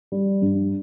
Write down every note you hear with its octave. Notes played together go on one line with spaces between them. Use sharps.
G3
G2